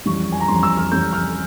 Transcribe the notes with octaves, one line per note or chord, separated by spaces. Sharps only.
F2 E3 G3 C#4 C#6
G#5
A#5
F2 E3 G3 C#4 C6
E6
F6
F2 E3 G3 C#4 G6
F6